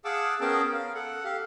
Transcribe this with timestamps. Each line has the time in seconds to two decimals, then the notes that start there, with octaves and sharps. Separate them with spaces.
0.05 G#4 F5 F#5 A5 D6 E6
0.41 B3 C#4 G#4 A#4 G5 A5
0.73 F5
0.95 A4 F#5
1.24 G4 F5